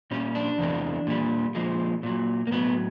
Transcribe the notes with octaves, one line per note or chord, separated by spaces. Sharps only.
A#2 G3 C#4
D4
E2 C3 E3 G#3
A#2 G3
A#2 F3 G#3
A#2 F#3
A#3
A2 F#3 B3